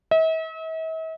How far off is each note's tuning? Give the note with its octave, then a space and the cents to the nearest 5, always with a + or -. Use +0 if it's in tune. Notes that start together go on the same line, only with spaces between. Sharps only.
E5 -45